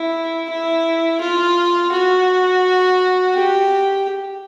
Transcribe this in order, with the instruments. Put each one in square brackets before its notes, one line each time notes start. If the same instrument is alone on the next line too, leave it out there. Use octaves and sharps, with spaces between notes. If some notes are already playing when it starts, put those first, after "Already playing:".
Already playing: [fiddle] E4
E4
F4
F#4
G4